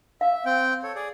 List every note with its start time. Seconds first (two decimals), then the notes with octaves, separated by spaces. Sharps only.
0.21 E5 F5
0.45 C4 G5
0.83 A4 C#5
0.95 G#4 D5